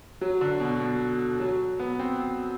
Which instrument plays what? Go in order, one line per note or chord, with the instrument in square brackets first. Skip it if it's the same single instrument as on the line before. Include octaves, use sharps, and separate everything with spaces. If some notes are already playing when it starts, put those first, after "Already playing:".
[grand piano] F#3
D3
B2
B2
F#3
B3
C4